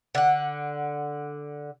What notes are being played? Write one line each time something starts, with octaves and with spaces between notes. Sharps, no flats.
D3 F#5